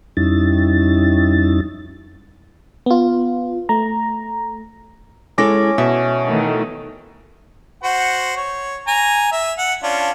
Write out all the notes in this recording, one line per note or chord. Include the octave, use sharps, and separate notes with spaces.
F2 G3 C#4 D#4 E4 A6
B3 F4
A3 A#5
G#3 C#4 E4 A4 D6 A#6
B2 E5
D#3 E3 A3
F#4 C5 F#5
C#5
G#5 A#5
E5
F#5
C#4 D4 F4